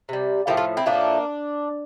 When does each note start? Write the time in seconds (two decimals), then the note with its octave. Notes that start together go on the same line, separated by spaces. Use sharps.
0.09 C3 G3
0.47 A2 F3 A3 G4 A#4
0.57 F4 A4
0.77 C4 E4
0.86 A2 F3 A3 A#3 D4